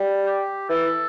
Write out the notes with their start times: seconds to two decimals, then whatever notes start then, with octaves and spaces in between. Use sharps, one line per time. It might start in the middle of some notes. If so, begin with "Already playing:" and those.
Already playing: G3
0.26 G4
0.69 E3 A4